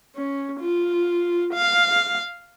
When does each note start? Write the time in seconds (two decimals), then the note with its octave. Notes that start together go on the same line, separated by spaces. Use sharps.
0.15 C#4
0.60 F4
1.54 F5